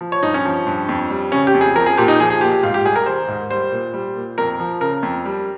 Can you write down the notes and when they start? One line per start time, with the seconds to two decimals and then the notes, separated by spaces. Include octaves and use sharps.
0.01 F3
0.12 C#5
0.23 G2 D#4
0.34 C#4
0.45 F3
0.67 G2
0.89 F2
1.10 G3
1.32 C#3 C#4
1.47 G4
1.54 F2
1.61 G#4
1.75 F3 A#4
1.86 G#4
1.98 A#2 G4
2.08 D#4
2.19 F3 G#4
2.30 G#4
2.41 A#2 G4
2.52 G4
2.63 G#2 F4
2.74 G4
2.86 G3 G#4
2.96 A#4
3.06 D#3 C5
3.28 G#2
3.51 G3 C5
3.72 A#2
3.94 G3
4.16 A#2
4.38 F2 A#4
4.60 F3
4.81 C#3 A#4
5.03 F2
5.25 G3